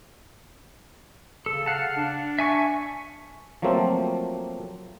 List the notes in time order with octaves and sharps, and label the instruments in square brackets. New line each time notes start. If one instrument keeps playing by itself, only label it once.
[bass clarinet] C#3 [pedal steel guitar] A4
[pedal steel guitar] F5 F#5 A5
[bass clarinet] D4
[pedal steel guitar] E5 G#5 C#6
[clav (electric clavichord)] F3 F#3 A3 A#3 C4